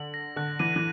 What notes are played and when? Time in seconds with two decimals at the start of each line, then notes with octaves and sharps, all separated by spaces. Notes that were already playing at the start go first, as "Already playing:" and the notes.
Already playing: D3 F#7
0.14 A#6
0.36 D3 F#6
0.59 E3 D#7
0.76 E3